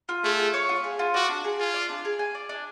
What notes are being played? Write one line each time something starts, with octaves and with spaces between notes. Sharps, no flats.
F4
A3 G#4
F4
C#5
F4
G#4
F4
F#4 D5
D4
G#4
F4 G#5
D5
D4
G#4
G#5
D5
D4